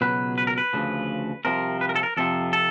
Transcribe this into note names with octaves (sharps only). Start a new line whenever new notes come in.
C#2 B2 F#3 B4
B4
A#4
B4
D2 C#3 F3
C2 C3 F3 A#4
B4
A#4
A4
A#4
F2 C3 F3 A4
A4